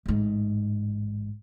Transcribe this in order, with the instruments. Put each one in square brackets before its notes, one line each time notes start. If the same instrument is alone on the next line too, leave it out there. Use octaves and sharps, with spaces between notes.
[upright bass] A1 G#2